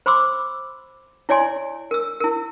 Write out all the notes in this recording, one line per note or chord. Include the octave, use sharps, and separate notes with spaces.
C5 B5 C6 D6 E6
E4 C#5 D5 G#5 C6
A#4 E6
E4 A#4